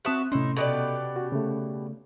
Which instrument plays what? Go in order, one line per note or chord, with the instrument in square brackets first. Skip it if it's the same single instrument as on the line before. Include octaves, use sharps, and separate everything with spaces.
[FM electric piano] C4 D#6 F#6 [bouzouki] F#4 E5 A5
[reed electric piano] A2 C6 [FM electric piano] C3 C#4 [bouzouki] D#4 E4
[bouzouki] B2 G4 D5 [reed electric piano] A4 D#5
[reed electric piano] F#4
C#3 A3